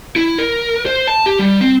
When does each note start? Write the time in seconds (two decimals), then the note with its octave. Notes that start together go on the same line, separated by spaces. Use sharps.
0.16 E4
0.38 A#4
0.86 C5
1.08 A5
1.26 G4
1.39 G3
1.61 C4